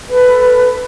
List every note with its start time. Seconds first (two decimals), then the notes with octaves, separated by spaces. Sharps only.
0.09 A4 B4